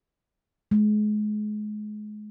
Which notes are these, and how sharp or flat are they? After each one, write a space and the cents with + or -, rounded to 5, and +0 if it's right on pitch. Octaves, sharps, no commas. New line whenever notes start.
G#3 +30